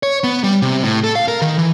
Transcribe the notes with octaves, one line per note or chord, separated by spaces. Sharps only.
C#5
B3
G3
C3
A2
A4
F5
A#4
D#3
E3